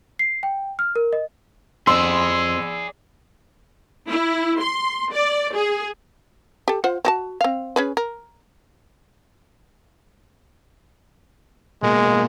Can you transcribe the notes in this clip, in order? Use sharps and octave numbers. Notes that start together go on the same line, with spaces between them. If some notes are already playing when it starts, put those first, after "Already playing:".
C7
G5
F6
A#4
D#5
F2 G#4 D5 C6 E6
E4
C6
D5
G#4
G4 A4
F4 C5 F#5
C4 F#4 A5
C4 F5
C#4 G#4 B4
A#4
B2 G#3 A#3